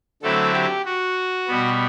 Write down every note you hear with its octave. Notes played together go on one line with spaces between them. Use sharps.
D3 F#3 A3 C4 E4 A4
G4
F#4
B2 G3 B3